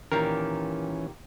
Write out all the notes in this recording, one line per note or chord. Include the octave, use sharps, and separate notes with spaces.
A#2 D#3 E3 C#4 G4 A#4